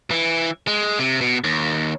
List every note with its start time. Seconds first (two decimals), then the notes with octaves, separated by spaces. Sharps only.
0.11 E3
0.67 G#3
0.99 C3
1.21 B2
1.44 D#2